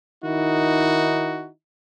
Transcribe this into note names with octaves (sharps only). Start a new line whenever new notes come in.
D#3 D#4 E4 F#4